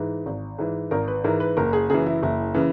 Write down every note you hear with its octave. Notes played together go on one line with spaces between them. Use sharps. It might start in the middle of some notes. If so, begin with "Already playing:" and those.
Already playing: G#2 E3
G#1
G#2 E3
G#1 A#4
B4
G#2 E3 A#4
B4
F#1 A#4
G#4
F#2 C#3 E3 G#4
E4
F#1 E4
C#3 E3